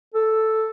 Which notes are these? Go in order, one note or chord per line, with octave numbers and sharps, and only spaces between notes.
A4